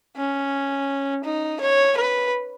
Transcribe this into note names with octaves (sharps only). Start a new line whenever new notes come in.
C#4
D#4
C#5
B4